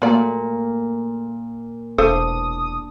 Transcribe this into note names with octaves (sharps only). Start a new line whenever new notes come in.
A#2 F#3 A3 D5
E1 D4 A4 C5 F5 D#6